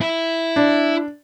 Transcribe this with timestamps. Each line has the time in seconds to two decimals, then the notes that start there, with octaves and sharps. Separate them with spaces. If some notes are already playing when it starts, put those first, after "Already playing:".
0.01 E4
0.56 D4